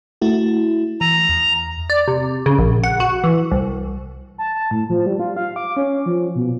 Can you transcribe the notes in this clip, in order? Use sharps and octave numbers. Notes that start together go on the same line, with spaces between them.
A3 E4 F#4
E3 A#5
E2
D5
C3
C#3
A#1
F#5
F#4
E3
C2
A5
A5
A2
F3
G3
F4
F5
D6
C#4
F3
B2